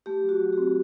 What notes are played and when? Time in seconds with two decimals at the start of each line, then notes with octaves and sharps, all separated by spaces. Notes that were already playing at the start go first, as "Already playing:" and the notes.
0.06 A3 G4
0.23 F#3
0.29 F#4
0.41 F#3
0.53 G4
0.58 C4